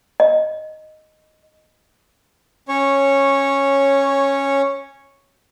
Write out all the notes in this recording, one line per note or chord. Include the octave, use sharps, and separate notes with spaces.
D#5
C#4 C#5